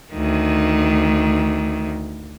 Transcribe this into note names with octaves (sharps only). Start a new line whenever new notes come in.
D2 D#3